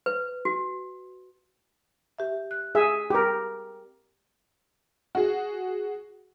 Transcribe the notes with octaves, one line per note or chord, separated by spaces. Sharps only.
B4
F#4
G4 E5
F#6
G#4 E5
G4 A#4
F#4 G#4